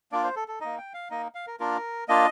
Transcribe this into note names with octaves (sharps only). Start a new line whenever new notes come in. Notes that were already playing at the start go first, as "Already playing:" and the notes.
A#3 D4 F4 D5
C5
A4
A4
A#3 D#4 D#5
G5
F5
A#3 D#4 D#5
F5
A#4
A#3 D4 F4 A#4
A#3 D4 F4 D#5